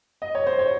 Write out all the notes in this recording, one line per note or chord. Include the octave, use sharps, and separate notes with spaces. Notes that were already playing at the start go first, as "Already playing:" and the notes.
D#5
C#5
C5
C#5